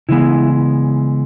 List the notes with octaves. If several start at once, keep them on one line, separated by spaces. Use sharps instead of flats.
C#3 E3 G#3 B3 E4